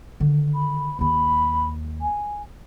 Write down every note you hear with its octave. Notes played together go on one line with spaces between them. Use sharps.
D3 D#3
B5
D#2 D#3 B5
G#5